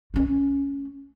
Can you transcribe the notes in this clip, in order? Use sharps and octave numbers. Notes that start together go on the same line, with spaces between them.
A3 C#4